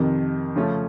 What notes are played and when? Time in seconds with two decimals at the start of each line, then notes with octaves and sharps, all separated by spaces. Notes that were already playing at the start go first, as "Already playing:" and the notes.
Already playing: F2 C3 D#3
0.56 C#3 F3 A3 C#4